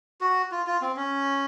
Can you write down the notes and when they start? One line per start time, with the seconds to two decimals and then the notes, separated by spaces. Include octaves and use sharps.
0.21 F#4
0.51 F4
0.67 F4
0.81 C4
0.97 C#4